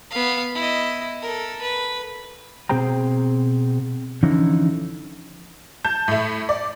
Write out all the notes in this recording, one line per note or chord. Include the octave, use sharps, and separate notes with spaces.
B3 F5
E4 D#5
A4 A#4
B4
B2 C4 G#4 C5 G5 A#5
D3 E3 F3 C#4 D#4 E4
A5 G6
A2 A3
D5